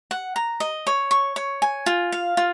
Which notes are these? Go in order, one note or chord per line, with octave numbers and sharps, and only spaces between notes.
F#5
A#5
D#5
C#5
C#6
C#5
G#5
F4
F5
F4